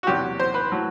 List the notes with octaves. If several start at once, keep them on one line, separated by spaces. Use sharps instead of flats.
F#4
E2 C3 F#3 G4
C5
B4
A2 F#3